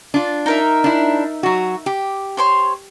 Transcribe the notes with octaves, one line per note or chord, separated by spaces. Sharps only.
D4 F4
D#4 A#4 E5
D4 E4
F#3 F#4
G4
C5 C#5 C6